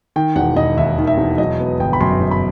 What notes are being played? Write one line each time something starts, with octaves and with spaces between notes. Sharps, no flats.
D#3 G5
E1 F#5
E1 D#5
D#2 E5
D#3
E5
E1
F#3 D#5
B3
G1 G5
B5
F#2 C6
F#3
B5